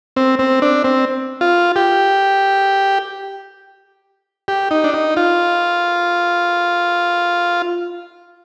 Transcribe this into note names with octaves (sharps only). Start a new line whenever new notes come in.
C4
C4
D4
C4
F4
G4
G4
D#4
D4
D#4
F4